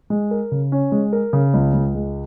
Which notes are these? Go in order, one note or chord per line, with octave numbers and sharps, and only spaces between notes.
G#3
A#4
C#3
C#4
G#3
A#4
C#3
C#2
C#2
G#3